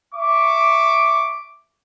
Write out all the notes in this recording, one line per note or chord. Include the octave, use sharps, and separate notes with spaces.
E5 C#6 D6